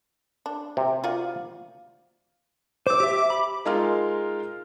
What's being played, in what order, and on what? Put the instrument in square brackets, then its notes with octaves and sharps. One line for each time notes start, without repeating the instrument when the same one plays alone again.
[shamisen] D4
[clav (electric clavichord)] C3
[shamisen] F4 F#4 D5
[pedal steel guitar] C5 E6 [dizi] D6
[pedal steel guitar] G4 E5
B5
[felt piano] G#3 D#4 F4 A#4 F5 F6